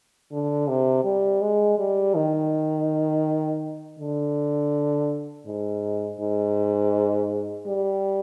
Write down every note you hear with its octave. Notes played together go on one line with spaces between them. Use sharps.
D3
C3
G3
G#3
G3
D#3
D3
G#2
G#2
G3